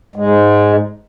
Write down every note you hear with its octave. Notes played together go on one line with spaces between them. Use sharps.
G#2 G#3